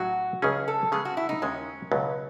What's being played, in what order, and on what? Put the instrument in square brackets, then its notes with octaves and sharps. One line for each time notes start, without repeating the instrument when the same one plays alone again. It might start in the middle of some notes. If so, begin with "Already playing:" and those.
Already playing: [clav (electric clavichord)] A2 F#3 C#4 G#4 [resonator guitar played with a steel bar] F#4
[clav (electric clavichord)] C#2 C#3 F#3 C#4 [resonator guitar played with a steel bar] G#4
[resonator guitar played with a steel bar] A4
[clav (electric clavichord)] C#3 G#3 B3 [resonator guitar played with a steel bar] G#4
[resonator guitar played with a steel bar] F#4
E4
D#4
[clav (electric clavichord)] D#2 C#3 G#3 [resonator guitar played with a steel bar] C#4
[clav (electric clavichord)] C#2 B2 F#3